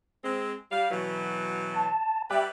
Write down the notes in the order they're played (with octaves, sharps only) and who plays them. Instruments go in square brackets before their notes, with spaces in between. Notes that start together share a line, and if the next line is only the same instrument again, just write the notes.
[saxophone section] G#3 C4
G3 F5
B2 E3 F#3
[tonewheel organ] A5
[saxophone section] G3 B4 [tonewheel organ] E5 G5 D6